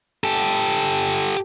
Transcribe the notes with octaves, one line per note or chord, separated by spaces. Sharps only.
G4 A4